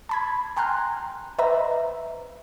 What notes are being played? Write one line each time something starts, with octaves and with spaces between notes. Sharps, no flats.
A5 B5 G#6
G5 G#5 A#5 C6 F6 F#6
B4 C5 D#5 E5 A#5